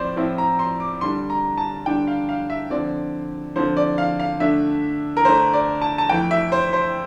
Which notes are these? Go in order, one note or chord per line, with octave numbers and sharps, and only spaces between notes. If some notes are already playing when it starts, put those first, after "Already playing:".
Already playing: A2 F3 C4 C5 D5
A2 F3 C4 E4
A#5
C6
D6
D3 G3 D4 C6
A#5
A5
D3 G3 D4 G5
F5
F5
E5
D3 F3 C4 D5
D3 F3 C4 C5
D5
F5
F5
D3 A3 D4 E5
A#4
D3 A3 D4 C5
D5
A5
A5
F2 E3 A3 G5
E5
C5
C5